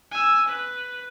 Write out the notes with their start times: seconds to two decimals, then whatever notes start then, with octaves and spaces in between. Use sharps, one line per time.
0.11 G#5 E6
0.48 B4